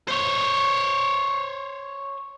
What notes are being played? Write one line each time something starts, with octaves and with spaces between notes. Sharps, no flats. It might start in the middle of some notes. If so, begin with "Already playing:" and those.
C5 C#5